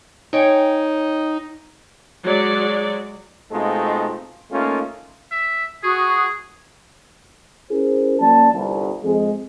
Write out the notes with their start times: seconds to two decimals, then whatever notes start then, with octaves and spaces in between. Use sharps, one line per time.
0.33 D#4 C#5 G5 G#5
2.24 F#3 G#3 D5
3.51 B2 G#3 A3 C4 D#4 F4
4.52 A3 A#3 C#4 D#4 F4
5.31 E5
5.84 F#4 G#4 C#6 D#6
7.70 C#4 E4 G#4 A#4 C5
8.19 F#3 A#3 C#4 D5 A5
8.53 G1 C2
9.04 F2 G#3